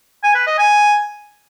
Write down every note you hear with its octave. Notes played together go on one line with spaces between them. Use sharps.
G#5
B4
D#5
G#5